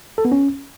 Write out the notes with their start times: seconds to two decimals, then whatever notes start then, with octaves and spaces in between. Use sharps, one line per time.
0.18 A4
0.25 B3
0.32 C#4